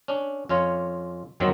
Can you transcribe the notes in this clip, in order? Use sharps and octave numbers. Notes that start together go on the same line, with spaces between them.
C#4 D4
F2 C#4 F4 C#5
G1 F#2 D#3 F#3 C4